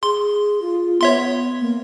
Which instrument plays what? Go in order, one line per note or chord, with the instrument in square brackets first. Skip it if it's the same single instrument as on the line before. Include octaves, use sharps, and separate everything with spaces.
[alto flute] G#4 [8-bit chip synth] C6
[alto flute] F4
[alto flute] B3 [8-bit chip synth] C#5 E5 C6
[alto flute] A#3